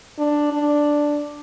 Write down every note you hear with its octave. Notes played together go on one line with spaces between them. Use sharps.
D4
D4